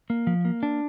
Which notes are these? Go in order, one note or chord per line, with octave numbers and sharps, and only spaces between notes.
A#3
F3
A#3
D4